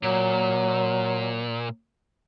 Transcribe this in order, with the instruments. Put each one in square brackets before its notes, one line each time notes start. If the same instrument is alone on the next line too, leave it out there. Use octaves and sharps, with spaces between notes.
[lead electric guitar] A#2 [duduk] F#3